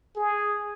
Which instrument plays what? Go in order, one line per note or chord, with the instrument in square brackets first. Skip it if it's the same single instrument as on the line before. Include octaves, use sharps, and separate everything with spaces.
[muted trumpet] G#4